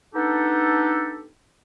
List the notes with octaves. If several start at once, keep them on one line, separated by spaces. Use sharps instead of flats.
B3 D4 D#4 G4 A4